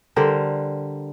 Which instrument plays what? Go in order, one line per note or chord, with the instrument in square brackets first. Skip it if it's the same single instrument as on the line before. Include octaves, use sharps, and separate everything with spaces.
[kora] D3 G3 A#4 C5